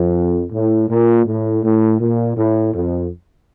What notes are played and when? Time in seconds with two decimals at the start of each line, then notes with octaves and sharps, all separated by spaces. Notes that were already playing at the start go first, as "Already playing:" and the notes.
Already playing: F2
0.51 A2
0.89 A#2
1.25 A2
1.63 A2
2.00 A#2
2.37 A2
2.74 F2